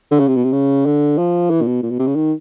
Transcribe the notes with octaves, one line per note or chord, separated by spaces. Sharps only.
D3
C#3
C3
B2
C3
C#3
D3
F3
E3
A#2
B2
A#2
B2
C3
C#3
D#3